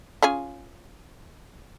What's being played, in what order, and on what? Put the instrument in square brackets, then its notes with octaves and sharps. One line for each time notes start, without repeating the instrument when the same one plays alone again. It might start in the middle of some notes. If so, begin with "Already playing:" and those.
[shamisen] C#4 F4 G#4